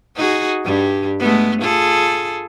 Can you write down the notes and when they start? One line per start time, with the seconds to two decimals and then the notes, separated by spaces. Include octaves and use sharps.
0.16 D#4 F#4 G#4
0.65 G2 G3
1.19 G#3 A3 B3
1.61 F4 G#4 A4